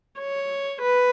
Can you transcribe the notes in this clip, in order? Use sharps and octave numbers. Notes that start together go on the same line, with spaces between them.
C#5
B4